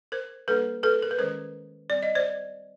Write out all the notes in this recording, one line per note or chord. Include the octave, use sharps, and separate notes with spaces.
A#4 C5
G3 A#3 D4 A4 B4
A4 B4
A#4
B4
D#3 G#3 C#4 A#4 C5
G3 C4 D5
D#5
C5 D5